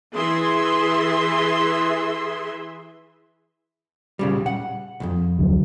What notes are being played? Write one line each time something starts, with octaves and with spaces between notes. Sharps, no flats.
E3 G#4 E5 C6
A#2 C#3 G3
F#5
C2 F2
D2 D3 F#3